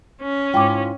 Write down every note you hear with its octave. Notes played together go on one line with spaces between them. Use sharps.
C#4
G#2 E4 F4 G5 D6